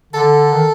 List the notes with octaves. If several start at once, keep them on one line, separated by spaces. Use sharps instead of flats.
D3 A4
D#3